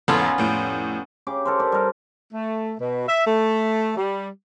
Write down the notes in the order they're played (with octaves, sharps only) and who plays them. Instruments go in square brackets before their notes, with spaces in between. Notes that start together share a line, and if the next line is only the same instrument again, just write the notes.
[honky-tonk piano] E2 G#2 A4 [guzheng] B3 C#4 F4
[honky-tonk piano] F1 A2 D7
[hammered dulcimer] C#3 G4 D6
A4 A#4 C5
G4 C5 D5
G3 A#4
[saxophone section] A3
B2
E5
A3
G3